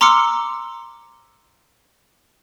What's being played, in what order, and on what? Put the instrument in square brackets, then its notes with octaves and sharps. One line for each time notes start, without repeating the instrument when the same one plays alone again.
[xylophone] A#5 C6 D6 E6 F6 C#7